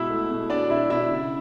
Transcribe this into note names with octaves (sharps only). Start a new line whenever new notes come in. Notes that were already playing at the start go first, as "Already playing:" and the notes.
Already playing: B2 G#3 E4 E5
A3
B2
B2 D4 D5
B2 E4 E5
B2 E4 E5
C#3